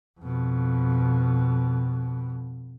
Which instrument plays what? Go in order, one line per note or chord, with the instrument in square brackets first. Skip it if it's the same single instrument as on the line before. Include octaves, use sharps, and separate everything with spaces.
[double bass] F2 B2